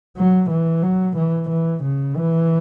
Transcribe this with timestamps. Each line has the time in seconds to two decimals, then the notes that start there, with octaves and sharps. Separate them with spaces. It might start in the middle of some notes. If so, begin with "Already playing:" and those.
0.17 F#3
0.50 E3
0.83 F#3
1.16 E3
1.50 E3
1.83 C#3
2.16 E3